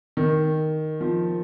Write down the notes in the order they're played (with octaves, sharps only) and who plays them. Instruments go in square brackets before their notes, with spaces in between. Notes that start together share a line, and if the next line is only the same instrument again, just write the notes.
[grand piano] D#3
F3